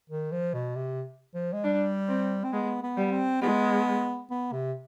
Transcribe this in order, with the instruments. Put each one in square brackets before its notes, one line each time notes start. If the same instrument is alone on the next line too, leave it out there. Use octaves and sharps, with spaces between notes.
[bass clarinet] D#3
F3
B2
C3
F3
G#3
[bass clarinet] G3 [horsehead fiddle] D4
[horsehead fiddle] C4
[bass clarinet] C4
[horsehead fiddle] G#3 [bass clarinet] B3
[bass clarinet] B3
[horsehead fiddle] G3
[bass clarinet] C4
[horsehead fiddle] G#3 [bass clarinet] B3
[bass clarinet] B3
C3